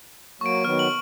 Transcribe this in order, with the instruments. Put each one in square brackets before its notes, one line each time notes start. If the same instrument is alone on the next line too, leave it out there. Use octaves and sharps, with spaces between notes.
[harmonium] F#3 A#3 [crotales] C#6 D7
[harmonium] D#3 F#3 B3 [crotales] F6
[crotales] F#7